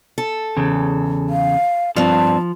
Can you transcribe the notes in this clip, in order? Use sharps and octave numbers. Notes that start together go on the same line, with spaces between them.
A4
E2 C#3
F5
G2 F3 C4 A5